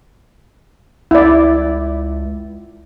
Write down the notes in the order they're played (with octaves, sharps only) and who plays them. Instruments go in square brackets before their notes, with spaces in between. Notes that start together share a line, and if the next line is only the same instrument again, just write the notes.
[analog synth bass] C#2 [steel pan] E4 D5